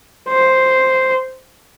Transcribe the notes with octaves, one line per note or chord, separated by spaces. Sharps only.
C5